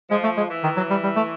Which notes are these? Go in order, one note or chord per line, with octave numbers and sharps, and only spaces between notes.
F3 G#3
A3
G#3
E3
D#3
F#3
G3
G3
A3